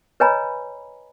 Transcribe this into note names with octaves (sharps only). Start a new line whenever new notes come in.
B4 C#5 D#5 G#5 A#5 B5